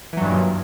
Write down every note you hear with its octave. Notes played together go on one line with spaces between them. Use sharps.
G2 A#2 D#3 E3 F#3